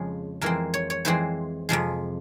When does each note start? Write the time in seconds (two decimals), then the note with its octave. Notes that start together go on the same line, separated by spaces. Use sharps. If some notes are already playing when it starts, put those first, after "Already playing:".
Already playing: F2 C#3 F3 G#3
0.41 F2 E3 G#3 C4 A#4
0.74 C#5
0.90 C#5
1.05 F2 E3 G#3 C4 C5
1.69 F2 C3 F3 G#3